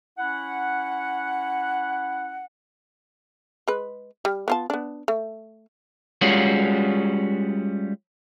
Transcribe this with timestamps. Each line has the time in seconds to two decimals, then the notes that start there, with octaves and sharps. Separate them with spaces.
0.17 C#4 E4 F#5
3.68 G#3 B4
4.25 G3
4.48 B3 F4 A5
4.70 B3 D4
5.08 A3
6.21 G3 G#3 C#4 F4 F#4